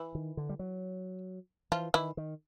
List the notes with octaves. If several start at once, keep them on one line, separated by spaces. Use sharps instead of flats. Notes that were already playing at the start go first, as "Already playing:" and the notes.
Already playing: E3 E4
D#3
D3
G3
F#3
E3 F3 F4
D#3 E3 E4
D#3